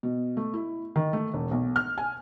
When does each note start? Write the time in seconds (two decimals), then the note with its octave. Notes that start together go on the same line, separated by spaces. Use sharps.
0.03 B2
0.37 A3
0.54 E4
0.96 D#3
1.13 A3
1.33 E1
1.51 B1
1.76 F6
1.98 G#5